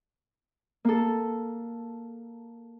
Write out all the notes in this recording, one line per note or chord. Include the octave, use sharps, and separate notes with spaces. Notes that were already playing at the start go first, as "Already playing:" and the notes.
A#3 A4